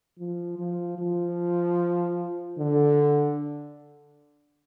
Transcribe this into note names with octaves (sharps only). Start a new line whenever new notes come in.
F3
F3
F3
D3